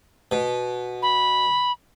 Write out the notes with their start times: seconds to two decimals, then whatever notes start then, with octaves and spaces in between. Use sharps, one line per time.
0.32 B2
1.02 B5